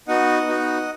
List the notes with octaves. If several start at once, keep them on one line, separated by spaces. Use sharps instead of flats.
B3 D#4 F#4 D#5 F#5
B3 D#4 F#4